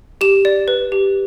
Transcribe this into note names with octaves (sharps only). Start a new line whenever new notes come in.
G4 E7
D5
B4
G4